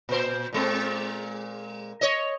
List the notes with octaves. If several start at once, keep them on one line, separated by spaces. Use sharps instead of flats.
A#2 C5
A#2 G#3 C4
C#5 D#5